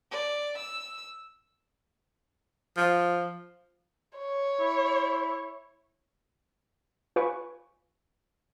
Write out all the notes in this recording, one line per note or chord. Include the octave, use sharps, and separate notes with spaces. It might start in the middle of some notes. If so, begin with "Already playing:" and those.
D5
E6
F3
C#5
E4
F4 B4 G#5 C#6